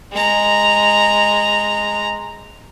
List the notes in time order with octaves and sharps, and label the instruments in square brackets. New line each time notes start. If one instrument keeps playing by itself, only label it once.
[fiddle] G#3 A#5